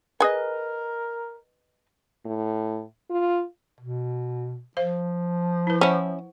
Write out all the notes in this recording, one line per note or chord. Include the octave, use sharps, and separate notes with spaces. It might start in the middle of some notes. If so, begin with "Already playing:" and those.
G#4 A#4 B4 D#5 G#5
A2
F4
B2
F3 C5 F5
E4 B4
C#4 E4 C5 F#5 C#6